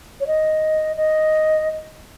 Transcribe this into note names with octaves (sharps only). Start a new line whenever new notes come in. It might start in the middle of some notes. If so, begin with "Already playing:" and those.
C#5
D#5
D#5